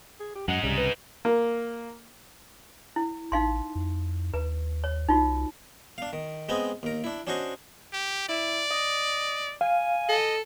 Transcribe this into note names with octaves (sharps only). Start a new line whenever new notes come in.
G#4
G4
F#2 G#3 D#4 F#5
C2 C#3 G3
B4
A#3
E4
A1 D#4 F5 C6
F2
D#2 B4
C#5
C2 D#4 F4 F#4
D4 F5
D#3
G#3 B3 C4 D#5 G#5
D#2 A#4
D4 E4
C#4 D4 F#4 C5 D#5 C#6
G4
E4 D5
D#5
F5 G#5
A4 D#5